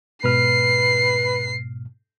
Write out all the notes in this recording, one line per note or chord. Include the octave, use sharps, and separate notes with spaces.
G#2 B2 B4 F6 C7